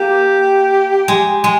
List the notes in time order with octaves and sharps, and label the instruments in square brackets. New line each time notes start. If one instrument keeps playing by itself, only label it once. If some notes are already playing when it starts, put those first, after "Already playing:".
Already playing: [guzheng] A#3 [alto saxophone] G4
[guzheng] G#3
G#3